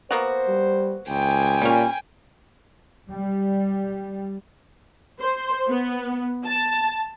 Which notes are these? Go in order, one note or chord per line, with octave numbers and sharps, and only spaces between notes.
A#3 B3 F#4 C5
G3
C#2 G5 G#5
A#2 G3 C#4
G3
C5
B3
A5